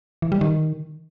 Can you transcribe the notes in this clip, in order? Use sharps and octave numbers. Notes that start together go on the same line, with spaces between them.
E3
G3
D#3